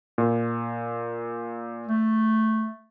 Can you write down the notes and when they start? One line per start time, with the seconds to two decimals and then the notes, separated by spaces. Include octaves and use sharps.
0.18 A#2
1.87 A3